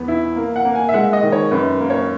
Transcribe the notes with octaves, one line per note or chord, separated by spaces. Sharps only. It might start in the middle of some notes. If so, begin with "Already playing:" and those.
Already playing: E2 B3
E4
A#3
F#5
A#3
G#5
E5
G#3 F#5
D#5
D#3
C#5
F#2 B4
A#3
C#5